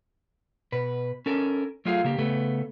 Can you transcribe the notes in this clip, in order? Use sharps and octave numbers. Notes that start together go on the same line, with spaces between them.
B2 B4
C#4 A4 A#4
F#3 A3 F4 G#4 F5
C#3 A#3 G4
C#3 A3 B3 A4